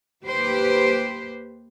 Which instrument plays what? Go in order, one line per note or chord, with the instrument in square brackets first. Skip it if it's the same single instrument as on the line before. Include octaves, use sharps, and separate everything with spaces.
[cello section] D#2 G4 B4 C5